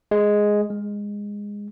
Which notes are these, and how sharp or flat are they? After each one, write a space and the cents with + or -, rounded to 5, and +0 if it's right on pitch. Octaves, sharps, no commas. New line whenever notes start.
G#3 +0
G#3 -15